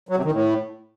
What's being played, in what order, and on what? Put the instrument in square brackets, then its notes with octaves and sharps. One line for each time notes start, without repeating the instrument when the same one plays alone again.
[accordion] F#3
C3
D#3
A2